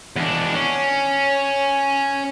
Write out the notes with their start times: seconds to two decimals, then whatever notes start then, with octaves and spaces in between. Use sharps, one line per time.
0.16 E2 D4
0.55 C#4